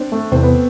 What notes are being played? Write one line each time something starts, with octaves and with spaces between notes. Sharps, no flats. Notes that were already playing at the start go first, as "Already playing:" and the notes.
Already playing: C4 D4
A3
E2 C3 E3 C4
B3